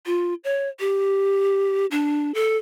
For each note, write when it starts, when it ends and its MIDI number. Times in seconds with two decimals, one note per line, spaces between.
0.06 0.34 65
0.44 0.69 73
0.80 1.86 67
1.91 2.32 62
2.35 2.57 69